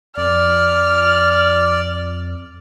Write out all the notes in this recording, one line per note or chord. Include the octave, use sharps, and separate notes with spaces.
F2 D5 F6